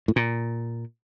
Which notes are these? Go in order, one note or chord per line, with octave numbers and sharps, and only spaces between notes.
A2
A#2